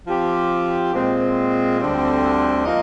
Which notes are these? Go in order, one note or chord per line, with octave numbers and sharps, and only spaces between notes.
F3 C4 G4
A#2 G#3 C4
D2 D3 G3 C4
F3 A#3 D#4 A#4 D#5